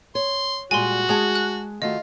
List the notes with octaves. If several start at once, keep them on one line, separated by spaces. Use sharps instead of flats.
C#5 C6
A#2 G3 G#3 F#4 G#5 C6
G#3 G#4 F#5 G#5 A5
F#6
D#3 A3 F4 F#4 D#5